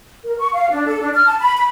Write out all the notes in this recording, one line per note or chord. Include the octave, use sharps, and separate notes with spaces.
A#4
C#6
F5
D4
A4
D4
F6
A5
B5
B5